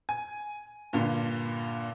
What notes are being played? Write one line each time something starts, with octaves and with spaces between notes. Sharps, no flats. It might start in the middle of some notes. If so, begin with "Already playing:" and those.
G#5
G2 A#2 D3